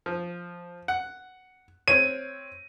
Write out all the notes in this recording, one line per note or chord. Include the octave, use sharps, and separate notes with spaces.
F3
F#5
C4 C#5 D#7